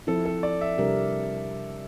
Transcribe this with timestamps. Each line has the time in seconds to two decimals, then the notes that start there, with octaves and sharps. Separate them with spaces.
0.07 F3 C4 E4 A4
0.25 A4
0.43 D5
0.61 E5
0.78 C3 G3 D4 G4 A#4